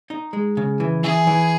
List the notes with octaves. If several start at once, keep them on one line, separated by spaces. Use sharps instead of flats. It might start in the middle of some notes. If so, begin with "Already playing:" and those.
D#4
G#3
C#3
E3
E3 G#4
E3